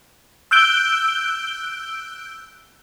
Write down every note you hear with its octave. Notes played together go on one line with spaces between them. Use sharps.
E6 F#6 G6 D7 G7